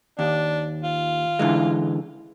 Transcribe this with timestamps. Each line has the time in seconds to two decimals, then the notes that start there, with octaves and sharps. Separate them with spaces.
0.19 D#2 D4
0.84 F4
1.39 D3 E3 G#3